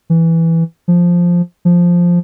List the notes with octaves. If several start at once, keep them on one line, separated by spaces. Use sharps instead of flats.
E3
F3
F3